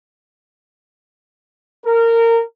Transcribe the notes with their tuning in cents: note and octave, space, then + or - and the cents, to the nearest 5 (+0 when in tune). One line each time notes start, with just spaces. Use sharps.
A#4 -20